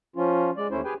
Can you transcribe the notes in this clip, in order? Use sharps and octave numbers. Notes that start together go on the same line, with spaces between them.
F3 C#4 F4
G#3 D5
D#2 A3 C#4 E4 C5
G4 G#4 B4 G5 G#5